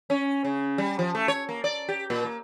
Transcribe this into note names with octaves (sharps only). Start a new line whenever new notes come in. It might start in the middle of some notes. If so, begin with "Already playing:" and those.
C#4
C#3
G3
F3
A3
C#5
A#3
D5
G4
A#2
A#3